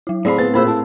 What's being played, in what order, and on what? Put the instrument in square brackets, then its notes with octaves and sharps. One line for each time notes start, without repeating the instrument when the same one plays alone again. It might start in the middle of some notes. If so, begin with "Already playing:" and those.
[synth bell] F#3 E4
[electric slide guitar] A2 C4 F5 [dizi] G#4 [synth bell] C5 [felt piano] D5 B5
[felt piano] B3 A6 [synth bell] B4
[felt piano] A#2 B5 E6 [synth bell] G#4 A#4 [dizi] C5
[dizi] E4 [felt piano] A5